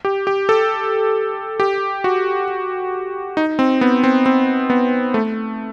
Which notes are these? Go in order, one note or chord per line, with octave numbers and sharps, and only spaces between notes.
G4
G4
A4
G4
F#4
D#4
C4
B3
C4
C4
B3
A3